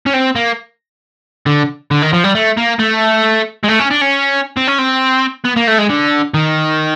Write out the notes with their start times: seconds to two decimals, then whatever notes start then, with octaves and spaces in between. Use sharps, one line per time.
0.06 C#4
0.14 C4
0.36 A#3
1.46 D3
1.91 D3
2.02 D#3
2.13 F3
2.24 G3
2.35 A3
2.57 A#3
2.79 A3
3.63 G#3
3.68 A3
3.79 C#4
3.90 D4
4.01 C#4
4.57 C4
4.67 C#4
4.78 C4
5.45 B3
5.57 A#3
5.68 A3
5.79 G#3
5.90 D3
6.34 D#3